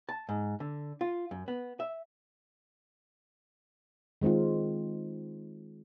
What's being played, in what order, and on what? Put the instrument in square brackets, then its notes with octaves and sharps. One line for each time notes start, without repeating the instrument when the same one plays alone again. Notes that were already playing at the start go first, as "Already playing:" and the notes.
[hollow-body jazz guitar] A5
G#2
D3
F4
F#2
B3
E5
[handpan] D#3 G#3 C4 D#4 F4